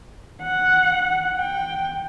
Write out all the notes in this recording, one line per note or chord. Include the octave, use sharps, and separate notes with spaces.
F#5
G5